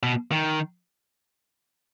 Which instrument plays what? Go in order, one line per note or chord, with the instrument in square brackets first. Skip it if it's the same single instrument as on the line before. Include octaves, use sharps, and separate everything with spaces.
[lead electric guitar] B2
D#3